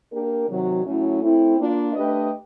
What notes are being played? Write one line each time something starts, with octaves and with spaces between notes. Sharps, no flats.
A#3 D4 G4 A#4
C3 D#3 F#3
A2 F#3 A3 C#4 E4
A3 C4 E4
A#3 D4 F4
A3 D4 G4 B4 D#5